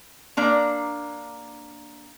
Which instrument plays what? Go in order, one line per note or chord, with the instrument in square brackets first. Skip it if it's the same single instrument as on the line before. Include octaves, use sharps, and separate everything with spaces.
[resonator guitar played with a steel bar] A#3 D4 A#5